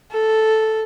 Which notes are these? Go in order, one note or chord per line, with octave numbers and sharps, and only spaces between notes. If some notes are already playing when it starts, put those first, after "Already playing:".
A4